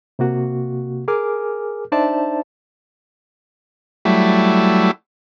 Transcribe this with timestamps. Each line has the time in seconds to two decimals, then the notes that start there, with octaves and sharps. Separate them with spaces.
0.19 C3 A#3 F#4
1.08 G#4 A#4 G#5 D6 F6
1.92 D4 D#4 C5 D5 E5 A5
4.05 F#3 G3 A3 E4